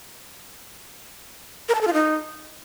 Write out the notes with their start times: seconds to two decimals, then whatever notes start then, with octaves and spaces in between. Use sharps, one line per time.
1.69 A#4
1.75 A5
1.81 A4
1.87 F4
1.93 D#4